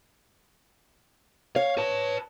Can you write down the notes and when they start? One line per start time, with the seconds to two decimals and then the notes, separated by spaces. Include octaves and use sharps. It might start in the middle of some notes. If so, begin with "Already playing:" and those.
1.56 C#5 F5
1.78 B4 A5